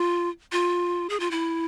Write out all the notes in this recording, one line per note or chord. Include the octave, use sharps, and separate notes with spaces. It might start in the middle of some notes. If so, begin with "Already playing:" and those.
Already playing: F4
F4
G#4
F4
E4